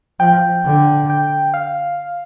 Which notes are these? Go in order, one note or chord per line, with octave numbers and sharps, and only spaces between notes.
F3 G5
D3
G5
F5